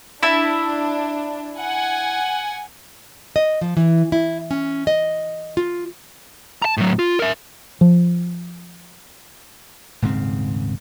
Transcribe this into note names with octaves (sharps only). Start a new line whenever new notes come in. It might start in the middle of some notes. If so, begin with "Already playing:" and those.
D4 E4 E5 A5
F#5 G#5
D#5
F3
E3
E4
C#4
D#5
F4
A5 A#5
A2 F#3
F4
A#4 E5
F3
D#1 G#2 C#3 C4